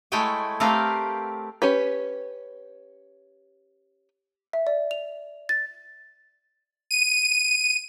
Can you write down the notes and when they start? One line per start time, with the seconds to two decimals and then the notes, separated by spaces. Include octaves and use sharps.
0.12 G#3 A3 E4 C#5 G5 G#5
0.60 A3 C4 G4 A#4 B4 F5
1.62 C#4 G4 B4
4.53 E5
4.67 D5
4.91 F7
5.49 A6
6.91 D#7